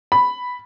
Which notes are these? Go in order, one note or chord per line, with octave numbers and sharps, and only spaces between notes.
B5